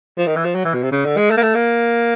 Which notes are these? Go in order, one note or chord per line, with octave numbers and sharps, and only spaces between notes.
F3
D#3
E3
F3
F#3
E3
B2
C3
C#3
D3
G#3
A3
A#3
A3
A#3